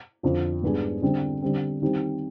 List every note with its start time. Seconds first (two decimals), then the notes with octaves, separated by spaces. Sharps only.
0.23 F2 D3 F3
0.63 G#2 G3 B3 D4 G#4
1.02 D3 G3 C4
1.42 D3 G3 C4
1.82 D#3 G3 C4 D#4 G4